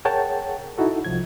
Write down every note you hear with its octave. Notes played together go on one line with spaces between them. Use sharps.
G#4 A#4 C#5 F#5 G5 A5
D#4 E4 F#4 A4
C2 F3 G#6